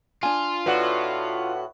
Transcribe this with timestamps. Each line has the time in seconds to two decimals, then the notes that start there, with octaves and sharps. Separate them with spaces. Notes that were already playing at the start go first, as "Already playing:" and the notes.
0.23 D4 F4 G#5
0.66 A2 F#4 B4 D5 F#5